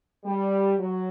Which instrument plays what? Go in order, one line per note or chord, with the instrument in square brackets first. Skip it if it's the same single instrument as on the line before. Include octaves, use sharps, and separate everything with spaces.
[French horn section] G3
F#3